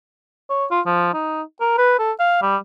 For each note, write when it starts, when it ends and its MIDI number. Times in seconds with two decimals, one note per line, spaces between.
0.49 0.65 73
0.71 0.80 65
0.86 1.11 53
1.13 1.42 63
1.61 1.75 70
1.78 1.96 71
1.99 2.12 69
2.19 2.37 77
2.42 2.56 55